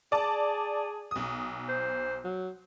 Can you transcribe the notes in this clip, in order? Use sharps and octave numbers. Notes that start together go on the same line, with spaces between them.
G#4 D5 A5
B1 D#6
C5
F#3